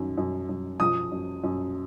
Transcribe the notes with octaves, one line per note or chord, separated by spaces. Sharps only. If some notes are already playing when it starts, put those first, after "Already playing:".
Already playing: F#2 D#3
F#2
F#2
F3 D#6
F#2
F#2